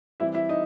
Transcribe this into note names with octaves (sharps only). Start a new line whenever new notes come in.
E3 G3 C4 E4 E5
E4 E5
D#4 D#5